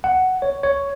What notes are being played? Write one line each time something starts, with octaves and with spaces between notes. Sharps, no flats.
F#5
C#5
C#5